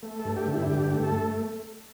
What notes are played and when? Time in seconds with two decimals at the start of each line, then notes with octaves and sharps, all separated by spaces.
0.03 A3
0.19 A4
0.25 G2
0.36 G4
0.47 D3
0.53 E4
0.70 G2 G4
0.92 A3
1.03 A4